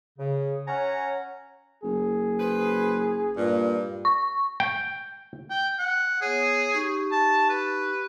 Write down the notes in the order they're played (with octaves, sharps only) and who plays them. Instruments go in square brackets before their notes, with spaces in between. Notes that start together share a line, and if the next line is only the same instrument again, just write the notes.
[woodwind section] C#3
C#4 C#5 F#5 G#5 A#5
[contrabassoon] F#1 [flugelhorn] G#4
[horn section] B4 C5
[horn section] G2 [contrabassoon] A#2
[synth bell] C#6
[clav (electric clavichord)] G5
[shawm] G5
F#5
[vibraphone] B3 C#5 [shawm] G#4
[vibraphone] D#4 G4 C#6
[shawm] A5
B4